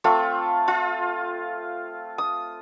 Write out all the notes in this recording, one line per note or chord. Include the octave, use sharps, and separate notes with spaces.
A3 C4 F4
F4
D#6